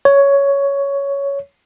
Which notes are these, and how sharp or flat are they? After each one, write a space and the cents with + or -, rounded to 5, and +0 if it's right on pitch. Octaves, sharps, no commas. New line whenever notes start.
C#5 +10